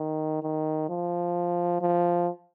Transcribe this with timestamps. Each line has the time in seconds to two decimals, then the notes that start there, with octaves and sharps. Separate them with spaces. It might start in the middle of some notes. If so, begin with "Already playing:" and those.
Already playing: D#3
0.43 D#3
0.89 F3
1.81 F3